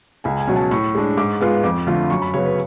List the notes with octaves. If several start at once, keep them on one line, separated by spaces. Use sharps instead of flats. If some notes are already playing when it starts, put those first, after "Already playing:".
C#2 G#5
G#5
B2 F#3 C#4
A5
A2 C#6
G#3 D4
G#2 D6
G#3 B3 F4
F2 D6
D3 F3 A3 F4
F#2 C#6
B5
C#3 F#3 B3 C#5
B4